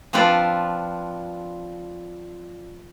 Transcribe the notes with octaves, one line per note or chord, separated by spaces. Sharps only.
F3 C4 D4 F4 B4 D5